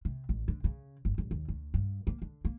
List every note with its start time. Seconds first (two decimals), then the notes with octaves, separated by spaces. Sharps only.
0.05 C3
0.29 A1
0.48 D3
0.64 C#3
1.05 G1
1.18 D1
1.31 D#2
1.48 D2
1.74 G2
2.07 A#3
2.22 D3
2.45 A#3